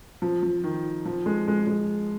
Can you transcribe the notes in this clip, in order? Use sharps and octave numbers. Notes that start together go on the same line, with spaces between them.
F3
F3
D#3
F3
G#3
G#3
G#3